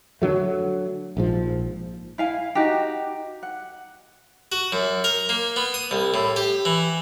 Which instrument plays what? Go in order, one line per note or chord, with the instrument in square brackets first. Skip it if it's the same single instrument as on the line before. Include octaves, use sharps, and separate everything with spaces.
[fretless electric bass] D3 F#3 A3
A#1 G#2 F3
[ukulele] E4 F5 G#5
D#4 F#4 G4
F#5
[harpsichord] F#4
F#2
A#4
A#3
B3
D#6
C2
A2
G4
E3